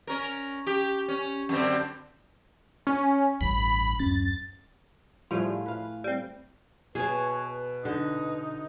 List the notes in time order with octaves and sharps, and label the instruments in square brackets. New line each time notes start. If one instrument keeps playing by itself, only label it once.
[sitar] C#4 A#4
G4
C#4
F#2 D3 C4
[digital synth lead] C#4
[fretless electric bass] A1 E2 G2 [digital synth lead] B5
[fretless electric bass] D1 F#2 C#4 [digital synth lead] A6
[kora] A2 A3 G#4 [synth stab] F3 G3 F4
[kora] B4 F5
[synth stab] G3 C4
[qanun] B2 C#5 [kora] G#4 [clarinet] B4
[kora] D3 [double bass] D#4